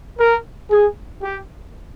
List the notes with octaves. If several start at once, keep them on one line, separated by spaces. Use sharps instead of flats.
A#4
G#4
G4